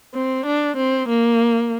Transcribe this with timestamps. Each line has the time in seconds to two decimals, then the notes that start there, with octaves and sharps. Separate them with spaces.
0.15 C4
0.46 D4
0.77 C4
1.09 A#3